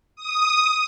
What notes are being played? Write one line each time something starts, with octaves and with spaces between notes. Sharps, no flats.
D#6